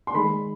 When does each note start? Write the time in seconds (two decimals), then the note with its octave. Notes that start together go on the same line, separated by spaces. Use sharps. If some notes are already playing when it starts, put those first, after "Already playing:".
0.07 C6
0.14 D#3 G#3 B5